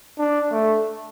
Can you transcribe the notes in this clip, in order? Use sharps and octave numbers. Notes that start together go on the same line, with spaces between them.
D4
A3